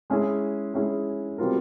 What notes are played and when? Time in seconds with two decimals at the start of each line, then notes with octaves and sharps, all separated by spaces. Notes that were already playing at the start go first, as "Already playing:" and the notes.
0.10 G#3 C#4 E4 G#4
0.74 G#3 C#4 E4 G#4
1.38 B2 G3 C4 F4 A#4